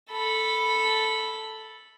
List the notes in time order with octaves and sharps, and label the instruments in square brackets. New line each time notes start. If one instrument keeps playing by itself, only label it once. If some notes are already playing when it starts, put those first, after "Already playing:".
[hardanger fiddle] A4 B5